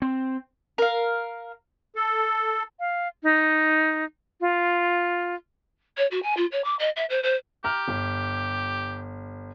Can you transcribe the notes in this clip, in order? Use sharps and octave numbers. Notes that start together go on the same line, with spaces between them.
C4
A#4 F5
A4
F5
D#4
F4
C#5
F#4
G#5
F4
C#5
D6
D#5
E5
C5
C5
G4 A#5 F6
G1